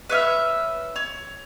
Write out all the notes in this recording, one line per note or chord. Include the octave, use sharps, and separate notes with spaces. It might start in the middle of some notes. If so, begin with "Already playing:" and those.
B4 C#5 E5 F6
C#5